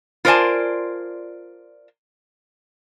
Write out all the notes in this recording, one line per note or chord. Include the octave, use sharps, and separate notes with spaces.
F4 A#4 C5 D5 G#5 A5